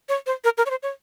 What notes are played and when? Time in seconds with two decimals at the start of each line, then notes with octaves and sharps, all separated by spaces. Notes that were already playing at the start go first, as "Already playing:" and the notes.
0.09 C#5
0.26 C5
0.44 A#4
0.58 A#4
0.66 C#5
0.70 C5
0.83 C#5